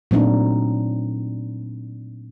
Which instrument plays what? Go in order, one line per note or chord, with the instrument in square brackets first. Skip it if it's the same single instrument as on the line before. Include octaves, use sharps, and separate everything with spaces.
[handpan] A#2 F#3 A3 C4 D4 D#4